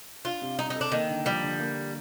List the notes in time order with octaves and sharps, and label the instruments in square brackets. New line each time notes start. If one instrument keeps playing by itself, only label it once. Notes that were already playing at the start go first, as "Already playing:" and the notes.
[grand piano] D4 [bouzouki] F4
[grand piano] C3
[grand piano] G3 [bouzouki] D#4
[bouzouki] D#4
[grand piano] A4
[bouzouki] D4
[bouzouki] D#3 [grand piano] A#3
[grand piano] D3
[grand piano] F3 [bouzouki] G3
[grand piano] D3
A#3